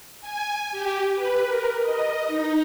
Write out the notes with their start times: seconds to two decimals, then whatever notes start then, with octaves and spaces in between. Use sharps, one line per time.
0.21 G#5
0.72 G4
1.15 B4
1.46 A#4
1.81 D#5
2.27 D#4